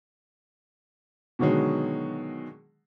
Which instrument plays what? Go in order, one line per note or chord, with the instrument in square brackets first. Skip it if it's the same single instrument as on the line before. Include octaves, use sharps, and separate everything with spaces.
[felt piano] B2 D3 D#3 F#3 G#3